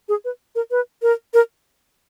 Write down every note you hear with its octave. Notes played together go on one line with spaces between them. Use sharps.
G#4
B4
A#4
B4
A#4
A#4